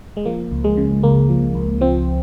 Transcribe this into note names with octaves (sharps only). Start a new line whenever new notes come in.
G#3
F3 A#3
C#2
G#3
C#3
C#2 A#3
F3
C#2
F3 C4